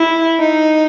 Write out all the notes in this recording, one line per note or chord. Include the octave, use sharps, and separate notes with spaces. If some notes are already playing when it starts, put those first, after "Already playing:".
Already playing: E4
D#4